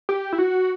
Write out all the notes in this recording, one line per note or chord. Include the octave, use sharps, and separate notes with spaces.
G4
E4
F#4